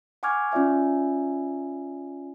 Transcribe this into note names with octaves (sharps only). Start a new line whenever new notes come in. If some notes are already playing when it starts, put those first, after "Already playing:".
F#5 G#5 C#6 D6 F6 G#6
C#4 F4 D5 E5 G#5